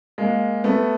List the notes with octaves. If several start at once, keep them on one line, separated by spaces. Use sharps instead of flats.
G#3 A#3
A3 B3